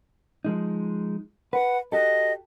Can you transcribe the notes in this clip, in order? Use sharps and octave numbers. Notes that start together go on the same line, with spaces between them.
F3 G#3 D#4
B4 F#5
F#4 G4 A4 D#5